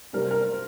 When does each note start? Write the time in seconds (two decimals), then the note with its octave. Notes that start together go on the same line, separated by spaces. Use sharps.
0.13 C3 G3 C4 A#4
0.22 C5
0.31 A#4
0.52 C5